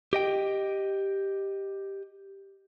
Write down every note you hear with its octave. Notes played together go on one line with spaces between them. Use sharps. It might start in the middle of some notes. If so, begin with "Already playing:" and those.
G4 D#5 G5